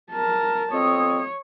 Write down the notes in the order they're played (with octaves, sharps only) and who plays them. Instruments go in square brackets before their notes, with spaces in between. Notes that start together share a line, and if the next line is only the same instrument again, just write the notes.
[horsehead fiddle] A#4 A5
[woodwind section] F2 C4 D#6 [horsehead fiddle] C#5